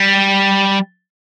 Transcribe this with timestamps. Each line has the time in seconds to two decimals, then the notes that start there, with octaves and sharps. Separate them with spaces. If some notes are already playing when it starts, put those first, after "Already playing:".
Already playing: G3